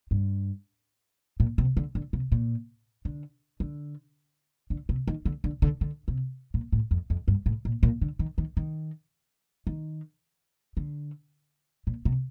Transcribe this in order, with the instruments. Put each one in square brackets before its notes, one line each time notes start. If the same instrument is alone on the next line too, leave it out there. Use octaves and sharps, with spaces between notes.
[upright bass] G2
A#2
C3
D3
D3
C3
A#2
D3
D3
D3
C3
D#3
D3
D3
D3
D3
C3
A#2
A2
F2
F2
G2
A2
A#2
A#2
D3
D#3
D#3
D#3
D#3
D3
A#2
C3